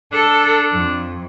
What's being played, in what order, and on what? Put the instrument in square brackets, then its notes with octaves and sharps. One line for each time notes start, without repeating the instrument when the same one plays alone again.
[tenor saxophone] D4 [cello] A4
[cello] F2